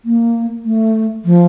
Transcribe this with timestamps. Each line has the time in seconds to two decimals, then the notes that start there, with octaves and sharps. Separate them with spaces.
0.05 A#3
0.65 A3
1.25 F3